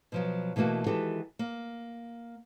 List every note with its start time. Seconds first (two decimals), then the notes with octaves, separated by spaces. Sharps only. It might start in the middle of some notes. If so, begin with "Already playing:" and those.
0.12 B2 F3 F#3
0.56 B2 E3 A3 A#3 F#4
0.86 D#3 E3 G#3 F#4 G4 A4
1.39 A#3